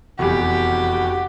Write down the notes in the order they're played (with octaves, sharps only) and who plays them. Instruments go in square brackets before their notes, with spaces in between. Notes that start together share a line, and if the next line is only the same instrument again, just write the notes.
[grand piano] F1 E2 [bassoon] F#4 [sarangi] G4